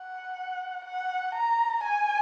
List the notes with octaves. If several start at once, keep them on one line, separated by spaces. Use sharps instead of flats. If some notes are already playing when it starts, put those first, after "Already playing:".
Already playing: F#5
F#5
A#5
G#5